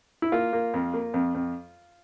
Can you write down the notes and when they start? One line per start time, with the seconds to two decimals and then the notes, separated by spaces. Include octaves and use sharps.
0.22 E4
0.32 A#3 F4
0.53 A#3
0.74 F2
0.94 A#3
1.14 F2
1.35 F2